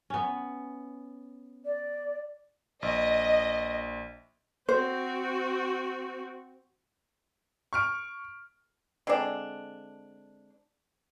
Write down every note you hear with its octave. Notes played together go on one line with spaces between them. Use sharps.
B3 C#4
D5
A#1 D#5
C4 F#4 C5
C#6 F6 D7
D3 G#3 C4 D4